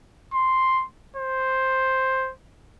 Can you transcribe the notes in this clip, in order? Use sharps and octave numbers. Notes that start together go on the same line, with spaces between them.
C6
C5